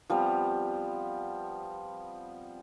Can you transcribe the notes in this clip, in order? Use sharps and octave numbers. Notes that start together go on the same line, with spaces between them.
F3 G3 B3 C4